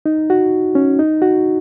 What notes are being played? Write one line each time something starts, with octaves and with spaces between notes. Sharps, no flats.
D#4
F#4
C#4
D#4
F#4